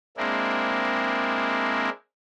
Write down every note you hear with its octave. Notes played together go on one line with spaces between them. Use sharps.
G#3 A#3 C4 D4 E4